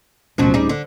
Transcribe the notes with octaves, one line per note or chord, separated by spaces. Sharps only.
D1 B2 F3 F#3 C#4
G3 D#4 G#4
D3